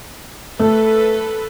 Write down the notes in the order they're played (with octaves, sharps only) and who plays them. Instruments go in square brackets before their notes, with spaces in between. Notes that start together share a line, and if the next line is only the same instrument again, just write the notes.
[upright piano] A3 [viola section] A4 B4